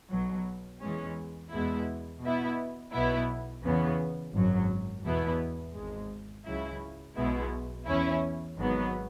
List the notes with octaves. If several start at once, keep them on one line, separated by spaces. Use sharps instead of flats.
B1 B2 F#3
E2 E3 G#3 C#4
E2 B2 G#3 B3 E4
B2 B3 E4
B1 B2 B3 E4
E2 C#3 E3 B3
G#1 F#2 F#3
E2 B2 B3 E4
G#1 G#2 G#3
C#2 C#3 F#3 E4
B1 B2 G#3 B3 E4
E2 E3 C#4 E4
G#1 G#2 F#3 B3